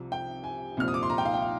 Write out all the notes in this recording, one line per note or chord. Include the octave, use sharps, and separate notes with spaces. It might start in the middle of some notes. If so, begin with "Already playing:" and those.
Already playing: C2 C3 F3
G5
G#5
C2 A#2 F3 F6
D#6
D6
C6
A#5
G5
F5
G5
F5